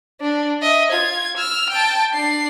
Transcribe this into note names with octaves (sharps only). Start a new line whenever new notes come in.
D4
D#5 E5
F4 G#6
E6 F6
G5 A5
D4 C7